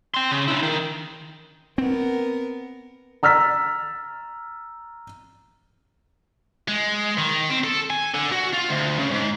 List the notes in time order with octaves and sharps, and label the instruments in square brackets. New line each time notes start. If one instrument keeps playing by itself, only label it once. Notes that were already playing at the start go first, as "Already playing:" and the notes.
[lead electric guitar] G5 C6
C#3
D4 E4
D#3
[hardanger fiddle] B3 A#4 [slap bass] C4
[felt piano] A#5 E6 F6 A6 B6
[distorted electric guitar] G#3
D#3
C4
A4
G#5
D3
F#4
F4
D2
C#3
G#2